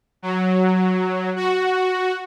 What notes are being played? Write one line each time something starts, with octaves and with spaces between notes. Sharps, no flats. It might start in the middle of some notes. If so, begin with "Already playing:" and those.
F#3
F#4